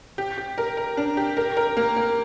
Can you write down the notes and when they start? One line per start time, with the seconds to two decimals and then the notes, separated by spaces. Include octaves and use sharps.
0.18 G4
0.38 G4
0.58 A#4
0.77 A#4
0.97 D4
1.17 G4
1.37 A#4
1.57 A#4
1.77 A#3
1.96 A#3